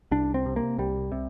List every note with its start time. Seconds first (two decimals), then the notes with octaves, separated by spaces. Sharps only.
0.11 C2 D4
0.34 C4
0.46 C3
0.56 A#3
0.78 C2 G3
1.12 C3